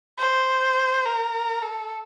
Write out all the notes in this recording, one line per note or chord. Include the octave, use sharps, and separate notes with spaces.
C5
A#4
A4